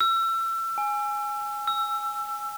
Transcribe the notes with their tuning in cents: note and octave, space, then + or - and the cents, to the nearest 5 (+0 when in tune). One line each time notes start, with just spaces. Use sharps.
E6 +30
G#5 -5
E6 +20